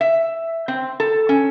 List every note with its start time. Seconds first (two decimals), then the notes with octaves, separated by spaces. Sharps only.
0.01 E5
0.68 C4
1.00 A4
1.29 C#4